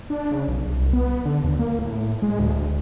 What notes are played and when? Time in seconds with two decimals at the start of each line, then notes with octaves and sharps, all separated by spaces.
0.10 D4
0.32 C#3
0.48 B1
0.66 C2
0.93 B3
1.25 D3
1.44 D#2
1.59 A#3
1.79 A2
2.22 G#3
2.39 D2